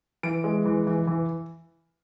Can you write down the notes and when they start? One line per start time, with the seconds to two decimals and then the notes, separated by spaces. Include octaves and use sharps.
0.23 E3 D7
0.44 G#3
0.65 E3
0.87 E3
1.07 E3